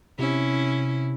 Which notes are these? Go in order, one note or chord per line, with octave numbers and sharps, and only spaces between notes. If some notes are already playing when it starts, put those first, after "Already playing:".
C3 C#4 E4